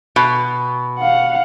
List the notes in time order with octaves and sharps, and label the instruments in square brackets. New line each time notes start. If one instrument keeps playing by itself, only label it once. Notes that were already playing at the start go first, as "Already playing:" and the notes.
[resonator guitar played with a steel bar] B2
[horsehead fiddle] F5 F#5